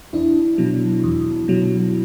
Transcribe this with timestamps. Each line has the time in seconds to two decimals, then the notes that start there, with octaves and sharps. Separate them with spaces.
0.13 E2 D4 E4
0.58 B2 F#3
1.04 E2
1.48 B2 F#3